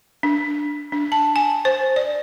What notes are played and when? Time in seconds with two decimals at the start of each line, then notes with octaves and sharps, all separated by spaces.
0.23 D4
0.92 D4
1.12 A5
1.36 G#5
1.65 C5
1.96 D5